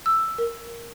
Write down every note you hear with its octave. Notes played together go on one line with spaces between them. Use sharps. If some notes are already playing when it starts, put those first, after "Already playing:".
E6
A#4